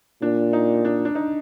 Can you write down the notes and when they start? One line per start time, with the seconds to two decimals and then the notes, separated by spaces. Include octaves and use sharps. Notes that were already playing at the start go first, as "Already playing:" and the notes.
0.22 A#2 D4
0.53 D#4
0.85 D4
1.05 D4
1.15 D#4